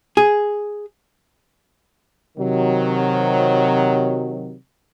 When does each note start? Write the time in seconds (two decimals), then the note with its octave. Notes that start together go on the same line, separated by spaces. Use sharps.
0.17 G#4
2.38 C3 D#3 F#3